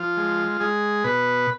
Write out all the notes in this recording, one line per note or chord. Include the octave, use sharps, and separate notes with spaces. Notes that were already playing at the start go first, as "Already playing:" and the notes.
Already playing: F3 F4
G#3
G#3 G#4
B2 B4